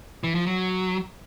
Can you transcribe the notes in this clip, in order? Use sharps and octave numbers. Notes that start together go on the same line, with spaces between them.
E3
F3
F#3